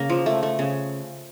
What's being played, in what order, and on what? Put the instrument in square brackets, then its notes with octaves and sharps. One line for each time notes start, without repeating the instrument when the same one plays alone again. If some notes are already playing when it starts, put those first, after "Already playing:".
Already playing: [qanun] C#3 A#3
F3
A3
A3
C#3